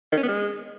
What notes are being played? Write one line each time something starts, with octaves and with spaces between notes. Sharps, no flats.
D#3
C#4
B3
G#3